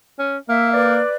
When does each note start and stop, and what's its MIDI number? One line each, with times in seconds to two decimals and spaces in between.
0.19 0.38 61
0.49 1.00 58
0.49 0.69 76
0.73 1.16 71
0.73 1.16 74